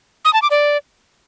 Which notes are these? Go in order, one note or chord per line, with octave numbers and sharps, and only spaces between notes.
D#6
A5
D6
D5